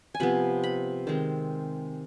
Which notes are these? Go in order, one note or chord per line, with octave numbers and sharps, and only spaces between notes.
G#5
C3 F3 B3 B5
B5
D#3 G#3 C4